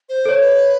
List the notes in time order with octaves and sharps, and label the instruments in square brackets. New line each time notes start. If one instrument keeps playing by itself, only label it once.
[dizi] C5
[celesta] A4 C#5
[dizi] B4